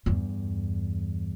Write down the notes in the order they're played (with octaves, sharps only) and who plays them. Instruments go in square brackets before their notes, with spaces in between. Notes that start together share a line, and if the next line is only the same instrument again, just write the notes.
[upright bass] E2 G2